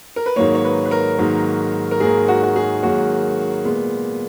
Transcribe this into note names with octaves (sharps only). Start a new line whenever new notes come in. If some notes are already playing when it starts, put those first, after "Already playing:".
A#4
B4
G#2 D#3 F#3 A#3 C#5
C#5
B4
B4
A#4
G#2 D#3 F#3 A#3
A#4
G#2 D#3 F#3 A#3 G#4
F#4
F#4
G#4
G#2 D#3 F#3 A#3 F#4
A#2 G#3 B3